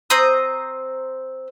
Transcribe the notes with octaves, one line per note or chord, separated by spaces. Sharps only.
C4 C5 A#5 D#6